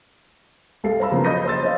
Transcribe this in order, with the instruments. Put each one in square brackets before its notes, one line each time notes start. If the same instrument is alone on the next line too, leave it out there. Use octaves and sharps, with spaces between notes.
[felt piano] C2 A4 F5 C7
C5 F5 A#5 B5 E6
C#3 F3 F#3 A#3 B3
D#5 B5 D#6 G6 A#6 D#7
C5 C6 E6 A6
C5 C#5 D#5 F5